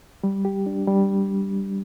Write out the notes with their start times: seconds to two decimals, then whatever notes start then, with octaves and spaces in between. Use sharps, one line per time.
0.24 G3
0.45 G4
0.66 D4
0.87 G3